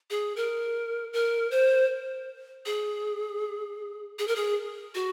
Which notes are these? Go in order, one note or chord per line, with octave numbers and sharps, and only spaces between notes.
G#4
A#4
A#4
C5
G#4
G#4
A#4
G#4
F#4